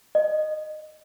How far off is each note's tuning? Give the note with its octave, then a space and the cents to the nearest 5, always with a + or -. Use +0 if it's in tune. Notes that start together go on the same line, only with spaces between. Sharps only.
D#5 -15